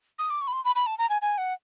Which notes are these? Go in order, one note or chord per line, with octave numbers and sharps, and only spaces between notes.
D#6
D6
C#6
B5
C6
B5
B5
A5
A#5
G#5
G#5
F#5